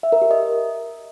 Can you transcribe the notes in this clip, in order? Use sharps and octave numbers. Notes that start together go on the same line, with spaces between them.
E5
A#4
G4
D#5